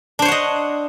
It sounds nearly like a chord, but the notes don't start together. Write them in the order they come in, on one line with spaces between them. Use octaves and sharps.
D4 C5 C#5 F#5 D#5